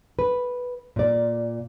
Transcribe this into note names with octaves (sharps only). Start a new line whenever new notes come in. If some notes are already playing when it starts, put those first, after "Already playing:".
B4
A#2 D5